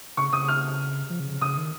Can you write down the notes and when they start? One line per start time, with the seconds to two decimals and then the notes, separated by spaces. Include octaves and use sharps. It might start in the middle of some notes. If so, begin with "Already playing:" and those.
0.17 C#3 C#6
0.33 C#3 D#6
0.48 F6
1.10 F3
1.20 C#3
1.30 C#3
1.41 C#3 D#6
1.57 D#3